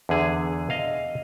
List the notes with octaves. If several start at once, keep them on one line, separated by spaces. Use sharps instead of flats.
E2 D3 G#4
D#5 F5